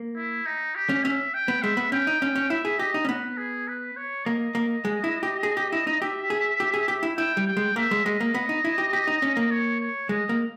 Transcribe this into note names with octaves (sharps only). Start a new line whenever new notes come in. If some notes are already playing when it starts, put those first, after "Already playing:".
Already playing: A#3
E4
D#4
G4
C#4
C#4 E5
G5
B3
G#3 E5
B3
C#4 G5
D#4
C#4
C#4
E4 E5
G#4
G4 D#5
D#4
C#4
B3 B4
G#4
B4
C#5
A#3 D#5
A#3
G#3
E4
G4
G#4
G4
E4
D#4
G4 E5
G#4
G4
G#4
G4
E4
E4 G5
G3
G5
G#3
A#3 E5
G#3
G#3 D#5
A#3
B3
D#4
E4
G4
G4
D#4
C#4
A#3
C#5
C#5
G#3 D#5
A#3